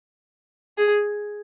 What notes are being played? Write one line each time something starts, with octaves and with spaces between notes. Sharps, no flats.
G#4